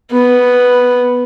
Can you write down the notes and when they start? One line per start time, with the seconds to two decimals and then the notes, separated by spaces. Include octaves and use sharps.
0.12 B3